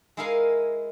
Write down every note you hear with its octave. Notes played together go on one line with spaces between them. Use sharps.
G#3 E4 G#4 A#4 F5 G#5